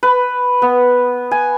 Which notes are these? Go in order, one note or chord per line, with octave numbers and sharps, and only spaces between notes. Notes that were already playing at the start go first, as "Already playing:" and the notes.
B4
B3
G#5